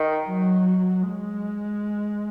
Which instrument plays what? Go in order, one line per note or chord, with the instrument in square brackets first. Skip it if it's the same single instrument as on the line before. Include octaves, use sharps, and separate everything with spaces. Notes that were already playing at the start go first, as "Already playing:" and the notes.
Already playing: [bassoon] D#3
[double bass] F#3
G#3